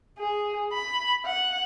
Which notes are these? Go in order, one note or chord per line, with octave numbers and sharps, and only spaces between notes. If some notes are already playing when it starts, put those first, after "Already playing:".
G#4
B5
F#5